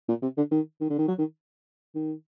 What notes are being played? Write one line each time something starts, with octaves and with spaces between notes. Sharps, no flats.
A#2
C3
D3
D#3
D#3
D3
D#3
F#3
D#3
D#3